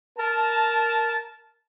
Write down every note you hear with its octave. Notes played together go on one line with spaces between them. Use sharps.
A#4 A5